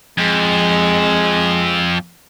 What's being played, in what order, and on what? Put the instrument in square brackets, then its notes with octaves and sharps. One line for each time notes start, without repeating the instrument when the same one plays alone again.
[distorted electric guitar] F2 [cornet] G#3